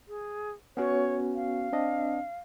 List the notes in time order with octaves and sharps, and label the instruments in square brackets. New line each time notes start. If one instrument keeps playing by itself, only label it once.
[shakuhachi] G#4
[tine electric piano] B3 C#4 F#4 [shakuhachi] C#5
[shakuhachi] F5
[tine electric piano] C4 D4 D#5